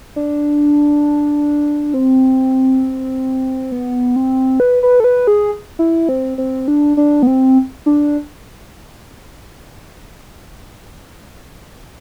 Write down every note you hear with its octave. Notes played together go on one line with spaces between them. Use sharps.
D4
C4
B3
C4
B4
B4
A4
B4
G#4
E4
C4
C4
D4
D4
B3
C4
D4